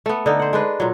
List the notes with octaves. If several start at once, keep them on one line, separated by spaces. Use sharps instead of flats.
A3 B3
D3 D#4
C5 F#5
G#3 D4 B4
A#2 F#3